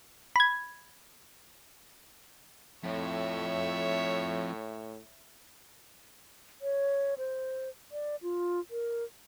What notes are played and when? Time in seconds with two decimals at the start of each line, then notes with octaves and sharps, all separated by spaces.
0.36 B5 G#6
2.84 F2 A2 C#5 E5
6.62 C#5
7.18 C5
7.92 D5
8.22 F4
8.71 A#4